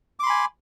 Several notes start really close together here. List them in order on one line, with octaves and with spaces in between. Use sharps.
D6 C6 B5 G#5